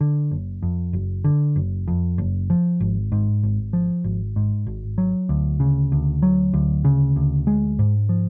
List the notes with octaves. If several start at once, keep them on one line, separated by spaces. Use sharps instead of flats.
D3
F#1
F2
F#1
D3
F#1
F2
F#1
F3
G#1
G#2
G#1
F3
G#1
G#2
G#1
F#3
D2
C#3
D2
F#3
D2
C#3
D2
G#3
G#2
F3